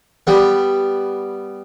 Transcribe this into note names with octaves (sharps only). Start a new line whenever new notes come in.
G3 B3